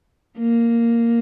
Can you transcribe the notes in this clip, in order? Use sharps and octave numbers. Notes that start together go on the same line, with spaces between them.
A#3